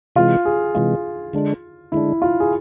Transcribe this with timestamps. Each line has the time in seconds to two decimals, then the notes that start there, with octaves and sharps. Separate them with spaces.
0.16 C3 E3 G#3 F4
0.45 G#4
0.75 C3 E3 G#3 F4
1.33 D3 G#3 D4
1.92 D3 G#3 D4 E4
2.22 F4
2.40 G#4